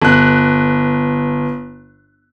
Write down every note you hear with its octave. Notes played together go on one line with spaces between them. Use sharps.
G1 F#6